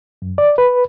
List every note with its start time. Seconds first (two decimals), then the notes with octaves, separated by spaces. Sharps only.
0.22 F#2
0.38 D5
0.58 B4